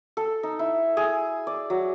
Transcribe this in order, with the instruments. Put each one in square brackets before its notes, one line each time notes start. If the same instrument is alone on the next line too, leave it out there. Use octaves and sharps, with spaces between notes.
[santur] A4
D#4
E4
G#4
D5
F#3